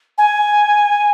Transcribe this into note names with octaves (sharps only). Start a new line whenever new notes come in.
G#5